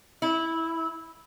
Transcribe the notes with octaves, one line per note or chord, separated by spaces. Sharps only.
E4